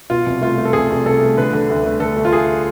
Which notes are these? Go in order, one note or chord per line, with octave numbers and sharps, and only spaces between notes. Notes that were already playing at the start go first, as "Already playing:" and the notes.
B2 F4
C2
A3 F4
A3
A4
C2 G#4
C2
C2 A4
A3
D3 B4
D3
D2
A3
D3 A4
A3
F4
A3 G#4